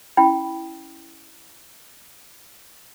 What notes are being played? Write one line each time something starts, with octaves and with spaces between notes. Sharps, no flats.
C#4 E4 G5 B5